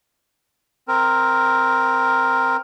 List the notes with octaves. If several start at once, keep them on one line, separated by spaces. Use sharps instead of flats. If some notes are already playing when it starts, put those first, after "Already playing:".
C4 A#4